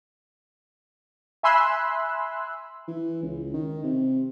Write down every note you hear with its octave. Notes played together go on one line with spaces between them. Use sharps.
E5 G#5 B5 C6 E6 F#6
E3
C#2
D#3
C3